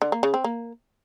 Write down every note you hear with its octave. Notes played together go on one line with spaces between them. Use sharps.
D3
A#3
C#3
C4
A#3